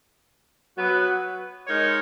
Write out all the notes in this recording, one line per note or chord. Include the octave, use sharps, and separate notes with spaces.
F#3 B3 F#4 B4
G#3 D#4 A#4 C#5